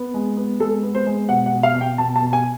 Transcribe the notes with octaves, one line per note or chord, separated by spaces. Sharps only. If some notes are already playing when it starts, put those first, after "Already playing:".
Already playing: B3
G#3
B3
G#3 A4
B3
C5
G#3
B2 F#5
F#5
B2
F5
B2
G5
B2 A5
A5
B2
G#5